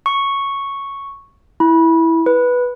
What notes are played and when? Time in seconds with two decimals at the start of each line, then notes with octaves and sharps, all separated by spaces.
0.06 C#6
1.60 E4
2.26 B4